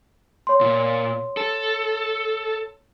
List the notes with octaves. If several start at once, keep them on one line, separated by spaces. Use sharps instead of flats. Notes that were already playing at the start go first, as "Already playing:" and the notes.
C#5 C6
A#2
A4